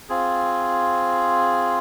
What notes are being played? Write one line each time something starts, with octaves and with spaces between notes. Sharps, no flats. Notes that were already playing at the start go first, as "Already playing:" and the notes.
C4 F4 G#4